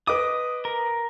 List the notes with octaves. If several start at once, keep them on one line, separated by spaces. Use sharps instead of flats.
B4 D#5 D6 D#6
A#4